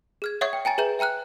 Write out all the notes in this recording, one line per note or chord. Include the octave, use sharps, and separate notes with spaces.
G#4 F6 G#6
C#5 E5 F#5 C#6 D#6 G#6
G5
G5 G#5 A#5 A6
G#4 B4 E5 A#5 G6 E7
E5 G5 A#5 F6 F#6